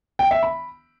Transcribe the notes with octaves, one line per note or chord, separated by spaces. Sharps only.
G5
E5
B5